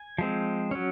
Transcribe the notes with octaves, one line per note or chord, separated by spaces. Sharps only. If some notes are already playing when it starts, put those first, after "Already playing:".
Already playing: G#5
F3 G#3 C4
F#3 C#4